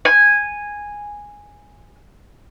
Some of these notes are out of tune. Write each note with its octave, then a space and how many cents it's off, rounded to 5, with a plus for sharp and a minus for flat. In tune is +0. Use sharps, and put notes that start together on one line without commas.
G#5 -10